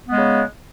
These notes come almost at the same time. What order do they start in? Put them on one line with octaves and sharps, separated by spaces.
B3 G#3 C#3